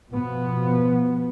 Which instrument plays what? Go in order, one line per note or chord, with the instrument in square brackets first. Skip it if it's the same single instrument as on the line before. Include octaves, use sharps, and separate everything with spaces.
[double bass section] B2 F3 B3